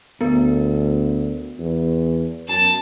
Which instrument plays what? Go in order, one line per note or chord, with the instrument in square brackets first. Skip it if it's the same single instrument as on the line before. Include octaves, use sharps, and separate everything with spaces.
[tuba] D2 [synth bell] B3 A#4
[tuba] E2
[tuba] F#2 [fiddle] A5